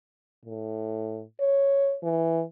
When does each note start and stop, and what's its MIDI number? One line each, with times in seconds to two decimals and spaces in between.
0.45 1.22 45
1.40 1.95 73
2.03 2.43 52